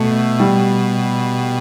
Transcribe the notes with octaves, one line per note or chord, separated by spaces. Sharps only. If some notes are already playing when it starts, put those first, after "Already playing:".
Already playing: B2 A3
G3